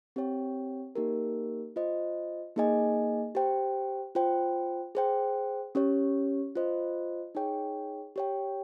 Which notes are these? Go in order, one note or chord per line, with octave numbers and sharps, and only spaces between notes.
C4 G4 C#5 G5
A#3 D#4 G4 A#4
F4 C5 D#5
A#3 D#4 G#4 D#5 G#5
G4 C5 G5
F4 C5 G5
G#4 C5 G5
C#4 G4 C#5
F4 C5 D#5
D#4 G#4 C#5 G5
G4 C#5 G5